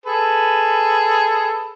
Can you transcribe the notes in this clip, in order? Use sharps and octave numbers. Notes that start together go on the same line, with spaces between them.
G#4 A4 B4